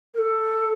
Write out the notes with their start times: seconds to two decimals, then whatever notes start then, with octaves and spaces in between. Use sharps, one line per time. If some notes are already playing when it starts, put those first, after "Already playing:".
0.14 A#4
0.18 A4